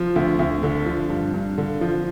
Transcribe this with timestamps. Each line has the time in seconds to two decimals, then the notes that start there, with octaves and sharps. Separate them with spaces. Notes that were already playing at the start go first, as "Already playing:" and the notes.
Already playing: F3
0.16 D2
0.39 D2
0.63 D3
0.86 F3
1.10 G2
1.34 G2
1.58 D3
1.81 F3